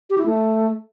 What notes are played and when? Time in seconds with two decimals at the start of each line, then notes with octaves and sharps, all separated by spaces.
0.10 G4
0.18 E4
0.26 A3